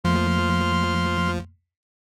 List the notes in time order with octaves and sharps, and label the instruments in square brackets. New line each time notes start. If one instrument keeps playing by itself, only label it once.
[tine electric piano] F2 A3 A#3 [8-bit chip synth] F3 [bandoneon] C6 F6